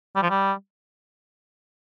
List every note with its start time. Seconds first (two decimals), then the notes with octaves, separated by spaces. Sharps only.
0.16 G3
0.22 F3
0.30 G3